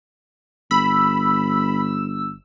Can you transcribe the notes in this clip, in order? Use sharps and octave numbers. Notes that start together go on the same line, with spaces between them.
G1 B5 E6